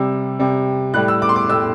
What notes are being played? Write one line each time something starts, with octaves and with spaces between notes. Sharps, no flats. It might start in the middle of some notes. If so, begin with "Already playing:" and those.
Already playing: C3 G3 E6
C3 G3
A2 G3 F#6
E6
D6
C6
D6
A2 G3 E6